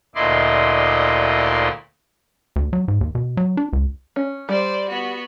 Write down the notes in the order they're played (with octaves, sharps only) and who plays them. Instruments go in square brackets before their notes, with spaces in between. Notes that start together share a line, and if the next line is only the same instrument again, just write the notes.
[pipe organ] D2 A#2 E4 D5 D#5 C6
[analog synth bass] D2
F#3
G#2
D#2
B2
F#3
D4
C#2
[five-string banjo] C#4
[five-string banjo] G3 [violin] C5 D5
[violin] B3 F#4